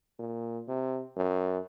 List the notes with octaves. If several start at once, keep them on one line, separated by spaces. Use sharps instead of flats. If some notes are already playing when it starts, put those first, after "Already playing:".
A#2
C3
F#2